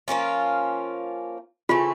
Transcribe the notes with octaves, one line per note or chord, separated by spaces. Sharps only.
F3 A#3 C#4 F4
C#3 E3 A3 C4 F4